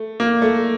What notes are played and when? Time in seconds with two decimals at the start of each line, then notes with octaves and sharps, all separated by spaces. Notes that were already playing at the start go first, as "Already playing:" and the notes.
Already playing: A3
0.20 A#3
0.42 A3